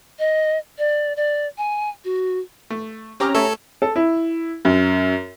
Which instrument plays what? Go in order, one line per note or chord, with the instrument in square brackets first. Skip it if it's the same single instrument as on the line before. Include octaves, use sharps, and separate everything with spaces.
[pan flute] D#5
D5
D5
G#5
F#4
[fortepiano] A3
[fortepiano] C4 D6 F6 [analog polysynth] C#4 G4 A#5
[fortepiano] A3 C#5 E5 [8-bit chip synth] A4
[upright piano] A4
E4
F#2